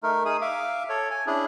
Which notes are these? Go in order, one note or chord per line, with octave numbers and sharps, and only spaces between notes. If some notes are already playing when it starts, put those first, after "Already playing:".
A3 D#4 A#4
D#4 G#4 D#6
E5 F5 D6
A4 C#5
G#5
C#4 D4 E4 G#4